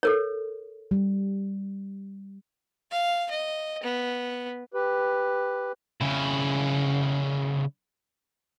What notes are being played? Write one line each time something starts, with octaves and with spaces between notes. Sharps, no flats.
A4 A#4 C#5
G3
F5
D#5
B3
G4 B4
C#3 E4